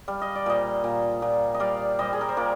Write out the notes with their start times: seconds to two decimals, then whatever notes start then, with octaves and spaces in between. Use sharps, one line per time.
0.08 G3 F5
0.21 D#5
0.35 D5
0.46 A#2 C5 D#5
0.84 A#2
1.22 A#2
1.54 D#5
1.60 G3 D5 F5
1.99 G3 C5 D#5
2.13 G#4
2.21 A#4
2.29 C5
2.37 A#2 A#4 D5